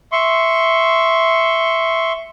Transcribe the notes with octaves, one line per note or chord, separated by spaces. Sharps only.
E5 C6 C#6